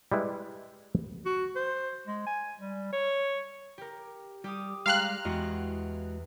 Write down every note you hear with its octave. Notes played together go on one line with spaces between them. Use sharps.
G3 G#3 E4 B4
F#4
C5
G#3
G#5
G3
C#5
G4 A#4
G3 G4 D6 D#6
G3 G#3 F5 G5 A#5 C6 F6 F#6
E2 G#3 F#4 D#5